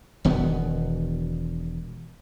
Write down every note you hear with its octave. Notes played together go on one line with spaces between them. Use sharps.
E1 B2 D#3 B3